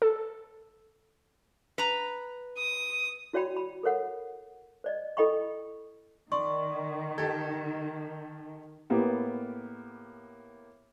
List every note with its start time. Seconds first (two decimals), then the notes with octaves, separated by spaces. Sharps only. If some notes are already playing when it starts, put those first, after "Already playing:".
0.02 A4
1.78 B4 A#5
2.58 D#6
3.33 E4 F#4 C#5 D5 G5 B5
3.56 B5
3.83 A4 A#4 C#5 F#5
4.84 C5 D5 D#5
5.17 E4 A4 D#5 G5 B5 C#6
6.32 D#3 D5 C6 C#6
7.18 G4 A4 G#6
8.90 A2 A#3 B3 G4